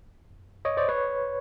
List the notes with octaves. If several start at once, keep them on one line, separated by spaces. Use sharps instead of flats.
C#5 D#5
C5 D5
B4 C#5